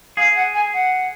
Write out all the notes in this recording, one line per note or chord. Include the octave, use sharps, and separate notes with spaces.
G#4 F5
F#5
G#5
F#5